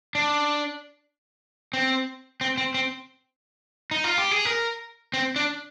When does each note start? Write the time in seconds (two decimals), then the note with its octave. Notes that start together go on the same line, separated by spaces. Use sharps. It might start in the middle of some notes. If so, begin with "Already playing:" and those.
0.15 D4
1.73 C4
2.41 C4
2.58 C4
2.74 C4
3.91 D#4
4.04 F4
4.18 G4
4.31 G#4
4.45 A#4
5.14 C4
5.36 D4